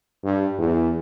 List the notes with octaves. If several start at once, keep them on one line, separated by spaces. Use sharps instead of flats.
G2
E2